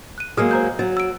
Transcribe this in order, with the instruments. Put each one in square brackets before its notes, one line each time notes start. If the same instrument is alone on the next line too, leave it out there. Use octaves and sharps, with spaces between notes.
[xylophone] F#6 D#7
[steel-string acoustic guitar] F#3 G#3 A#3 [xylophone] G#4 D#6 F6
[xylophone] C5 A#5 G6
[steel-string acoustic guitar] F#3 [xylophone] A6
[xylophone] E6 D7